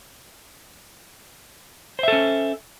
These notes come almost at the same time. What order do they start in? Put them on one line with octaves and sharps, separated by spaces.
C5 E5 A4 C#4